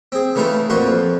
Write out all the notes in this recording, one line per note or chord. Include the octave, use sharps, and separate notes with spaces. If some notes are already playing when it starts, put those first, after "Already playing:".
C4 G#4
C#3 E3 A3 D#4 F4 B4
F2 A#2 F4 F#4 C#6
F2